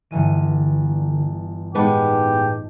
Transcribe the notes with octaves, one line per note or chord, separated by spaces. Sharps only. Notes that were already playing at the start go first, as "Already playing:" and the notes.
G1 D3 E3 D#7
A2 G#3 B3 D#4 G4 B4 A5